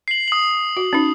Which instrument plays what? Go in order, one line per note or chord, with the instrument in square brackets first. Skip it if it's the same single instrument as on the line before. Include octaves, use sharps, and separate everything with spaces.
[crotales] C7 F#7
D#6 F#7
[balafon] F#4
C#4 D#4